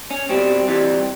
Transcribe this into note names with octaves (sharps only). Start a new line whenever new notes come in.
C#4
B2 G3 C4
C3 E3 G3